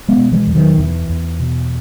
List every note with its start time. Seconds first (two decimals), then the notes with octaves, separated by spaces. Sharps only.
0.08 G#3 B3
0.16 B2
0.32 E3 G#3
0.47 E2
0.55 D#3 F#3
0.78 E2 E3
1.09 E2
1.39 B2